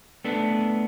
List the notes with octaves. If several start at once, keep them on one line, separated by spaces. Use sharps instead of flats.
A3 B3 D4